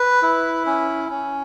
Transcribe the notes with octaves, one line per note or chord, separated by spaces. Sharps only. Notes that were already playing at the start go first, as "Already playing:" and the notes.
Already playing: B4
E4
C#4
C#4